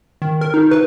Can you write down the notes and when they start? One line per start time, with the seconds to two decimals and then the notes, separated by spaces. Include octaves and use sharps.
0.22 D#3
0.41 A#4
0.54 D#4
0.71 B4